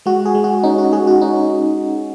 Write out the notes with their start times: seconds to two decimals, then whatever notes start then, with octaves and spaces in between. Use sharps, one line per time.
0.06 G#3 F#4
0.25 G#4
0.35 G#3
0.44 F#4
0.63 C#4 D#4
0.78 F#4
0.93 G#3 G#4
1.07 F#4
1.22 C#4 D#4